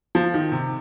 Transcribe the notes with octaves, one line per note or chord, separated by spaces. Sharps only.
F3
D#3
C3